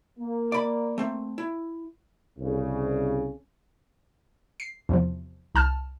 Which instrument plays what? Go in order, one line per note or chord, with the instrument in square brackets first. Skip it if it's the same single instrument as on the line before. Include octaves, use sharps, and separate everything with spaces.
[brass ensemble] A#3
[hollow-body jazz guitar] D5 B5
A3 C4
E4
[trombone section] C2 C#3
[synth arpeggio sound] C7
E2 C3 F3
C2 A5 F6